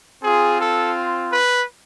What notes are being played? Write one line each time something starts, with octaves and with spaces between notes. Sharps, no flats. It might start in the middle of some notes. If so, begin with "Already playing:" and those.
C4 F4 G#4
A4
B4